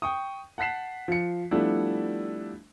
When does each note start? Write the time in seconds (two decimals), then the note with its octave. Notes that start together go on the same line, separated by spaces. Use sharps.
0.02 G5 C#6 D#6
0.58 F#5 A5 F#6 B6 C7 E7
1.08 F3 C#7
1.51 F3 G3 A3 B3 D4 E4